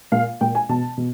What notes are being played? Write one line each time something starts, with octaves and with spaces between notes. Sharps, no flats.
A#2 F5
A#2 G5
G#5
B2 A5
B2